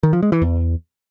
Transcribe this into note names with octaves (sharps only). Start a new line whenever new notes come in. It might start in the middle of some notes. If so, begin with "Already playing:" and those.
D#3
F3
G#3
E3
E2